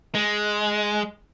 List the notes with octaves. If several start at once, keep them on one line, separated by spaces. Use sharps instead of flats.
G#3